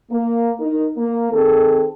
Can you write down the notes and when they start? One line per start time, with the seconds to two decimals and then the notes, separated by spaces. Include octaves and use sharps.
0.10 A#3
0.59 D#4 A#4
0.97 A#3
1.32 D#3 C4 G#4 A4